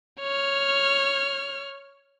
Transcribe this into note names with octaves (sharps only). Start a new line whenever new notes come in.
C#5 F6